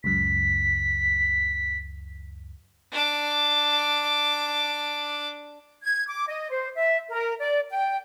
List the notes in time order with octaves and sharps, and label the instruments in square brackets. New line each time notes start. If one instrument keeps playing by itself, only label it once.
[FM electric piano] C#2 F#2 [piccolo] B6
[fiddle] D4 D6
[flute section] G#6
D6
D#5
C5
E5
A#4
D5
G5